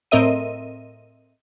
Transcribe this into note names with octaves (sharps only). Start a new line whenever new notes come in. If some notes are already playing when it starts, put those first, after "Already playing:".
A2 C4 A#4 D#5 E5 D#7